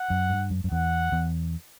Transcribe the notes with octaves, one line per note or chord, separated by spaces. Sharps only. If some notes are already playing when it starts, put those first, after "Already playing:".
Already playing: F#5
F#2
G2
F#2
F#2
E2 F#5
E2